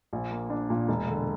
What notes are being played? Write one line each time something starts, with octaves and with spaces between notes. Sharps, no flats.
A#1
A#3
D4
A#2
E1
D3